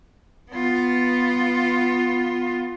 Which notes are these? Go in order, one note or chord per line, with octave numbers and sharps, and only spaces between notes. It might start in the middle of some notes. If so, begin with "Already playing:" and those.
B3 F4